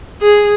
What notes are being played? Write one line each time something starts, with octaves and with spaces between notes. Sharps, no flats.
G#4